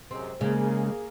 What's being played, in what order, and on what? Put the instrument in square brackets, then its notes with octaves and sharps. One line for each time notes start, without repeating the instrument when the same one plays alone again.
[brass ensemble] F#2 C3 G#3 [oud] C4
[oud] C#3 [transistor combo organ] G#3 [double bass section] A#3 [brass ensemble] G#4